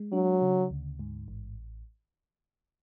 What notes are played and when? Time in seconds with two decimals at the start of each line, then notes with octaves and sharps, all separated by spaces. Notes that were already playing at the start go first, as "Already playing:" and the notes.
Already playing: G#3
0.12 F#3 D4
0.42 C#3
0.70 D2
0.99 G#2
1.28 A1